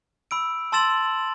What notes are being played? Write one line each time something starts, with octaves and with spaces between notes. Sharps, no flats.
B5 E6 D7
A5 C6 E6 A6 E7 F#7